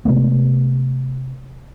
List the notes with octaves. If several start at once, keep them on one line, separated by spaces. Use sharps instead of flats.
C3 G#3 A3 B3